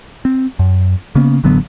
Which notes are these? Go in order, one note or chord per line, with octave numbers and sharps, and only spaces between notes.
C4
F#2
C#3 A#3 B3 C#4
A1 D3 F#3 B3